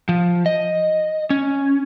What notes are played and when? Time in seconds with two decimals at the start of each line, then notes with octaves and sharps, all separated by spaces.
0.09 F3
0.46 D#5
1.30 C#4